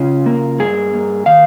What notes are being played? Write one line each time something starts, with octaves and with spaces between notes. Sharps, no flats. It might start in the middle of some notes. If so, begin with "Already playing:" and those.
Already playing: C#3 C#4 F4
A#3
G2 G#4
A#3
D#3 F5